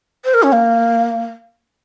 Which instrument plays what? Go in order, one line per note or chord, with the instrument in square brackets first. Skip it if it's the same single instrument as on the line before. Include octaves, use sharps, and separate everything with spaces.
[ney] C5
A#4
C#4
A#3